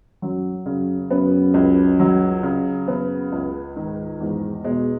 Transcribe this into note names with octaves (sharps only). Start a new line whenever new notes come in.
F#2 F#3
F#2 C#3
F#2 B3
C#2
F#3
C#3
F#2 B3
C#2
G#2 D#3
E2 G#2
B2 G#3